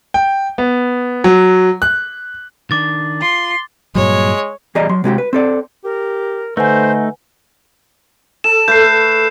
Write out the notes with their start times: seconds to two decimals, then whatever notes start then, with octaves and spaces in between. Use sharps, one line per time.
0.14 G5
0.58 B3
1.24 F#3
1.82 F#6
2.71 D#3 D4 D6 A6
3.22 F4 C6
3.95 G2 A#2 F#3 G#3 C#5
4.75 E2 G3 G#4 D5 D#5 A#5
4.89 F#3 C6
5.04 C3 G#3 F#4 G4
5.18 B4
5.33 C4 A4 D5
5.84 G4 A#4
6.57 D3 A3 D#4 B4 C5 F#5 G#5
8.44 A4 E7
8.68 A3 A4 B4 G6 C7